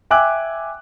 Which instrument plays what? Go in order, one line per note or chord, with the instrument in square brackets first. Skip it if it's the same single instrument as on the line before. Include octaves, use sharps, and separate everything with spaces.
[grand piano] E5 G5 G#5 D6 E6 F#6